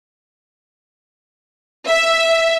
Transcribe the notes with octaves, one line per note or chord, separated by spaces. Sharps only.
E5